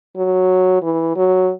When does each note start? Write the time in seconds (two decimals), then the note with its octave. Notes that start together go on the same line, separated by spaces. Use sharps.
0.17 F#3
0.82 E3
1.16 F#3